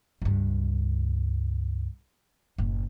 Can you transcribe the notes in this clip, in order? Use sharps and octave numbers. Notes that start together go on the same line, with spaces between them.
C#2 G2
F#1 A2